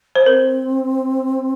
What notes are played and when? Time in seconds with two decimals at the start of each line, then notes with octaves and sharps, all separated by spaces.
0.15 C5
0.26 C4 A#4